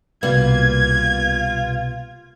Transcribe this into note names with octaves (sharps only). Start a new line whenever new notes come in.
C2 B2 G3 A#3 B3 F4 G#6